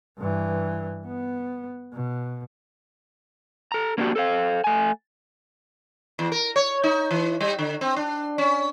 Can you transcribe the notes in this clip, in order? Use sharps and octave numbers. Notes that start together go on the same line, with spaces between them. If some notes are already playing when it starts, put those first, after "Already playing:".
G2 E3
B3
B2
A4 A#5
A#3 C#4 D4 E4 F#4 G4
A4 C5 F5
A3 G#5
E2
A#4
C#5
D#4
E3
G3
D3
C4
D4
C#4